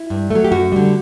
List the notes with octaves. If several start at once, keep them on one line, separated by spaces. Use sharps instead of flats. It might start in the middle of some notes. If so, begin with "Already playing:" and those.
Already playing: E4
G2
F#3 A3
G4
F#2 F#4
D3 G3